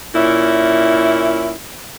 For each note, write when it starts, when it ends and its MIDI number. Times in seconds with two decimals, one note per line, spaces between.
0.15 1.54 46
0.15 1.54 61
0.15 1.54 64